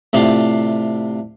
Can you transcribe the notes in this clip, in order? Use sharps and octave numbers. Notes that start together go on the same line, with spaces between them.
A2 C3 D4 F4 F5